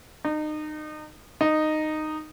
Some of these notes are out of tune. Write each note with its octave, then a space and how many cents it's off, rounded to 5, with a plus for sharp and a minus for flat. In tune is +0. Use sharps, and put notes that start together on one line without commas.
D#4 -30
D#4 -10